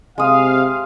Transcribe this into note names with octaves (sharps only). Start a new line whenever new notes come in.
C3 G#3 F5 D#6